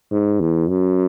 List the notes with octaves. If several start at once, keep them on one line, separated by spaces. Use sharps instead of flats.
G#2
E2
F#2